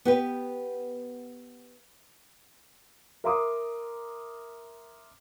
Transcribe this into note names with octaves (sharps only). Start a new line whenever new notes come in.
B3 G4 B4
A#4 E5 A#5 C6 D6 D#6